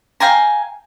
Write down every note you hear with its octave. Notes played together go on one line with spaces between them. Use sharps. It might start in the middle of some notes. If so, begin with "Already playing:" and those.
F5 G5 G#5 A#5